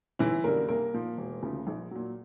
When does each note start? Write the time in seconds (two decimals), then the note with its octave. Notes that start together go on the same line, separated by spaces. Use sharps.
0.19 G1 E3 E4
0.44 F#2 D3 G3 A#3 A#4
0.69 C2 A#3 A#4
0.93 A#2 F3
1.18 E1
1.42 D2 C#3 F3
1.67 A#1
1.91 A#2 F#3